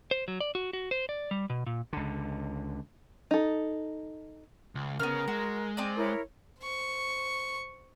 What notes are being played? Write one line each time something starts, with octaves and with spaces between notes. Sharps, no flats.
C5
F#3
D5
F#4
F#4
C5
D5
G3
B2
A#2
C#2 D3
D#4 A4
C#2
C#3 B3 C#4 A#4 F6
G#3 F#4
C4 D5 D#6
E4 A#4 C#5
C5 C#6